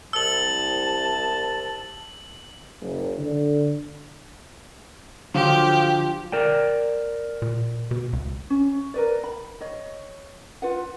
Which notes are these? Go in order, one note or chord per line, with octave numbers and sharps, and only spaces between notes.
C2 A5 E6 F#7
F#1
D3
D3 F3 F#3 F4 G4
A#4 D5 G5
A#2
B2
C#2
C#4
A#4 B4 D5
B5
C#5 D#5
F4 B4 F#5